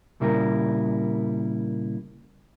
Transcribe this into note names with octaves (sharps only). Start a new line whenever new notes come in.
A#2 C#3 G3 E4 G4 A#4